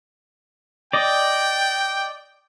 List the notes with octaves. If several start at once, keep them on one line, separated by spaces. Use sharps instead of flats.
D5 D#5 G5